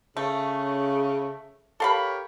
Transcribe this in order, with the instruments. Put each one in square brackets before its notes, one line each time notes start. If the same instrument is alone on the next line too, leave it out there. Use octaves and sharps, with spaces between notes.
[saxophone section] C#3 [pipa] A3
[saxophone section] G4 A#4 C#5 [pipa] A4 F5 B5